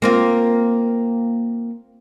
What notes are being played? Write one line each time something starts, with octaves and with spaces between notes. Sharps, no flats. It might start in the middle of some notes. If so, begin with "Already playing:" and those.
A#3 C4 F4